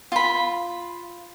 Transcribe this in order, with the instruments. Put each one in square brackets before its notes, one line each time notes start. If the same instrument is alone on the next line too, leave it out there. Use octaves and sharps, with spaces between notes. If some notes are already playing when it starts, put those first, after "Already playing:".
[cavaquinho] F4 B5